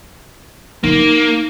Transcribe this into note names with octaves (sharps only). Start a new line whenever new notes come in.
A#3 D#4